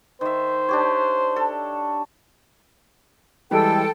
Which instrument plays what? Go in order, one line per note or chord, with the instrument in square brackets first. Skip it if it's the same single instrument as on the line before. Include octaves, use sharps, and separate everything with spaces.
[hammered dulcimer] D#3 E5 [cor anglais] C5
[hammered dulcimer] D4 G4 C#5
A4
[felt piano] E3 G3 G#3 [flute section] A4 G5